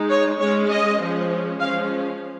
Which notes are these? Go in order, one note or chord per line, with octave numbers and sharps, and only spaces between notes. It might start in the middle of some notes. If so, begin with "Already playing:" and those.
Already playing: G#3 D#4
C#5
G#3 C#4 C#5
D#5
F3 G#3 C#4
F3 G#3 C#4 F5